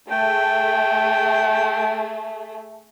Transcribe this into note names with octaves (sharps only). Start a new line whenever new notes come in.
A3 G#4 G5